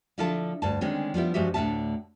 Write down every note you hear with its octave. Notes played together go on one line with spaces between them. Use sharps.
D3 F3 E4 F4 A4 A5
D2 G2 A5
D3 D#3 G#3 C4 C#4
F3 G3 B3 E4
G2 F3 G#3 F#4 G4 E5
D2 A2 D3 C#4 E5 A5